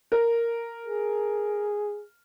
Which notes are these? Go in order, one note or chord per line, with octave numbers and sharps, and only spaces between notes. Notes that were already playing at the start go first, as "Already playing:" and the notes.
A#4
G#4